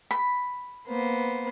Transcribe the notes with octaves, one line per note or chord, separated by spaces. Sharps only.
B5
A#3 B3 C5